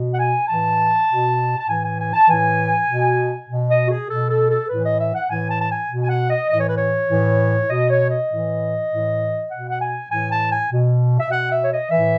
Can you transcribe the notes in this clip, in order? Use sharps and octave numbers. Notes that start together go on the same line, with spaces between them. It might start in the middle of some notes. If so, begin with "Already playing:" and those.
Already playing: B2
F#5
G#5
A2 E3 A5
B2
A5
A2 E3 G#5
G#5
G#5
A5
A2 E3 G#5
B2
B2
D#5
F#4
G#4
B2 A4
A4
A4
A2 E3 B4
D#5
E5
F#5
A2 E3 G#5
A5
A5
G#5
B2
G#5
F#5
D#5
A2 E3 D#5
C#5
B4
C#5
A2 E3
B2 D#5
C#5
D#5
A2 E3
A2 E3
B2 F#5
F#5
G#5
A2 E3 G#5
A5
G#5
B2
E5
B2 F#5
E5
C#5
D#5
A2 E3 E5